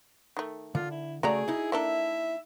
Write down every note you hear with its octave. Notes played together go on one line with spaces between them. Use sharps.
D#3 A3
D3 F4
E4
C#3 A3 F#4 G#4 A4 D5 A#5
D#4 E4
A#3 D4 A4 E5